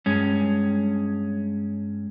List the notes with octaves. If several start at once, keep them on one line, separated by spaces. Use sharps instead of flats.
G2 G#3 C#4